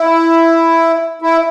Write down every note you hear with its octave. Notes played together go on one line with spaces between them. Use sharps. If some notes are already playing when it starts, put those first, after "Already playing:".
Already playing: E4
E4